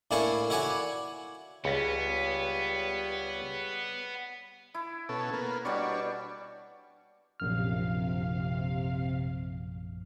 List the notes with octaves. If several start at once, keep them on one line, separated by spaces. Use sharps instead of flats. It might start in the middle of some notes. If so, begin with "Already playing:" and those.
A2 A#3 D4 E4 G#5 C#6
E4 F#4 C#5 D5 G#5
C#2 G3 B3 C#5
E4
B2 C#4 A4
A#3 B3
B2 G3 D4 C#5 D5
A#1 F#2 C3 F5 F6